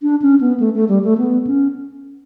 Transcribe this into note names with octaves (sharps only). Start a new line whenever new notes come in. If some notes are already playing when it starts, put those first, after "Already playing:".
D4
C#4
B3
A3
A3
G3
A3
B3
C#4